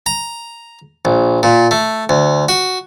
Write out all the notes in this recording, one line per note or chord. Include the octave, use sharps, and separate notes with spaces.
A#5
A#1
A#2
A3
D2
F#4